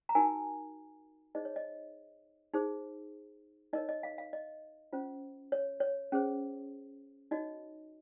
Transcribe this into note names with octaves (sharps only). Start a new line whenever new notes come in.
A#5
D#4 F#4 A#4 G#5
D#4 G#4 C5 D#5
C#5
D#5
D#4 G#4 C5
D#4 A#4 C#5 D#5
D#5
F5
F5
D#5
C#4 F4 C5
C#5
C#5
C#4 G#4 C5
D#4 F#4 C#5 D#5